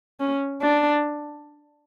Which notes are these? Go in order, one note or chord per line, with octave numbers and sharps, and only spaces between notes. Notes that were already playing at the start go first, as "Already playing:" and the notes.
C#4
D4